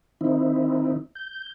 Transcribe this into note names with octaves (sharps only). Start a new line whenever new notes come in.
D#3 C4 D#4 E4
G6